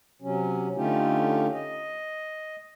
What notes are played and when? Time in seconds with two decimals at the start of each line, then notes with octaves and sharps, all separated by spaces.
0.22 C3 F#3 C#4
0.76 D3 A3 C#4 D#4 F4 G4
1.53 D#5